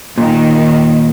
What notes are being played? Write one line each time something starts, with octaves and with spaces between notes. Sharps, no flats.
A#2 D#3